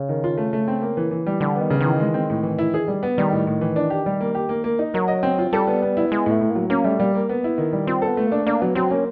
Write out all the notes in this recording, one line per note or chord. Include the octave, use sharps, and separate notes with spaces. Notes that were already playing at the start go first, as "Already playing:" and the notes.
Already playing: C#3
D#3
F4
A3
A3
C4
A#3
E3
E3
G3
D3 G3
B3
D#3
C#3
D#3 E3
G#3
C4
A2
E3
E4
G#4
G3
B3
D#3 G3
A2
A2
E3
D4
G4
G3
A#3
G4
A#3
A#3
D#4
F#3 A#4
D#5
C4
F4
G3 A4
B3
B3
E4
G#3 B3
A2 A3
A2
A#3
F#3
A#3 C#4
G3 A3
G3 A#3
A#3
B3
E4
D#3
G3
C4 F4
A4
B3
A3
A#3 D4
A#3 D4
F#3 B3
F#3 C4
A#3 C#4